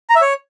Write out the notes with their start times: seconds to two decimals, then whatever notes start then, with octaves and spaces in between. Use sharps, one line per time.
0.10 A#5
0.15 E5
0.21 C#5